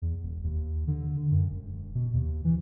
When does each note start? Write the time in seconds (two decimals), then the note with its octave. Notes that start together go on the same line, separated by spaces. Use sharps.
0.02 E2
0.23 E1
0.44 D#2
0.87 D3
1.31 F#2
1.50 E1
1.95 B2
2.14 D#2
2.44 E3